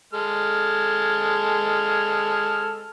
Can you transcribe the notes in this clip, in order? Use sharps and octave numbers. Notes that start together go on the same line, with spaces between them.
G#3 A4 F6